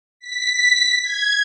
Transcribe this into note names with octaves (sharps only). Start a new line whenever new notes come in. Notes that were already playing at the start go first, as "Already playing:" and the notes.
B6
G#6